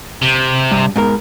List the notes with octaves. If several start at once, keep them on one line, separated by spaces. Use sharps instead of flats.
C3
G2
G#2 B2 A#4